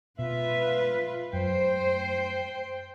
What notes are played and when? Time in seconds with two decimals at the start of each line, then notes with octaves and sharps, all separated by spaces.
0.19 B2 F4 B4 E5
1.33 F#2 C5 G5